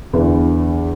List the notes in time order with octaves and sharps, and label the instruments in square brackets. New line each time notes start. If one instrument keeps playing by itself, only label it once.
[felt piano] E2 D3 E3